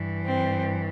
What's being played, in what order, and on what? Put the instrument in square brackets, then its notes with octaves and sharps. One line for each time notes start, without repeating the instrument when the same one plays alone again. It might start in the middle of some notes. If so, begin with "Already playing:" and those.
Already playing: [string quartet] G2 E3
C4